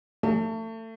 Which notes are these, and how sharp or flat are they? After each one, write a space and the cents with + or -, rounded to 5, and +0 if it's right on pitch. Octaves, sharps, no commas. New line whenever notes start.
A3 +30